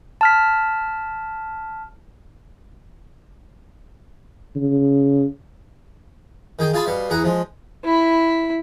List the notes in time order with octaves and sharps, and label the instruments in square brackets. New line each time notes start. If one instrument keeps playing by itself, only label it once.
[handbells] A5 F6 B6
[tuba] C#3
[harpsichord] D#3 G#4 G5
F4 G#4 F5 G#5 A5 B5
B2 G3 F5
E2 G#4 F#5 A#5
F3 G#3
[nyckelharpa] E4 B5